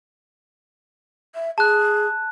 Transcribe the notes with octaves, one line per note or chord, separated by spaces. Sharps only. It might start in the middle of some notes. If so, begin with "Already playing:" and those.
E5
G#4 A5 F#6